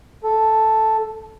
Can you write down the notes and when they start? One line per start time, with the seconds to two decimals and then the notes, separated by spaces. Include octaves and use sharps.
0.24 A4